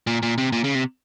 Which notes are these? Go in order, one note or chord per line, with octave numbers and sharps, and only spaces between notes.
A#2
A#2
C3
A#2
C#3
C3